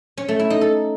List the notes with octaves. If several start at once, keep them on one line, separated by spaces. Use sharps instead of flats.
C#4
A3
E4
D#4
A4